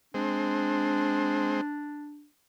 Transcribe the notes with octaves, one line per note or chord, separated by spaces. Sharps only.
G#3 C4 D4